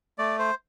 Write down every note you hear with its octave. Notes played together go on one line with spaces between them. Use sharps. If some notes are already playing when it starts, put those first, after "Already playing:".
A3 D5
C5